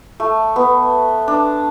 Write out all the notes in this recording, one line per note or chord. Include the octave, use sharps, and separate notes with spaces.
A3
B3
D4